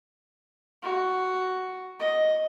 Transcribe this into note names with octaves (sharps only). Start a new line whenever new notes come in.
F#4
D#5